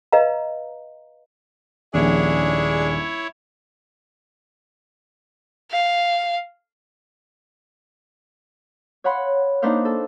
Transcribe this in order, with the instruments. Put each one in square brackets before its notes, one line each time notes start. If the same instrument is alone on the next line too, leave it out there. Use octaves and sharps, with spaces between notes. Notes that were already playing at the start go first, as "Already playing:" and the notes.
[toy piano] B4 D#5 F5 A#5
[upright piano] D#1 A#1 [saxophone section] G#3 D4 G#4 [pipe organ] E4 C#5
[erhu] F5
[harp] C#5 F5 F#5 B5 C6
A#3 D4 D#4 B4 C5 F5
A4